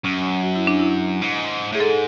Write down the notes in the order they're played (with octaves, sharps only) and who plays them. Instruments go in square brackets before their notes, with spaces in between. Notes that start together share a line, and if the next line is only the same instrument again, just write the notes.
[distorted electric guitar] F#2 [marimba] C#4
[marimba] F#4
E4
D4
E4
[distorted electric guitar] G#2
[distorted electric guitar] A2 [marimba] G#4
[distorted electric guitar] G#2 [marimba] A4